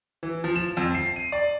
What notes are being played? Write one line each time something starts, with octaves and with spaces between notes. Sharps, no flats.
E3
F3
E7
F2
C7
D#7
D5